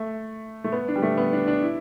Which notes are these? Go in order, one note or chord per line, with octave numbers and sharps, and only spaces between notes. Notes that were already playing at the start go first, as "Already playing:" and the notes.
Already playing: A3
A3
B3
D4
G3
A3
B3
D4
D4
E4